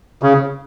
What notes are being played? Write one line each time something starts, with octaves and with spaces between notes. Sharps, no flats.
C#3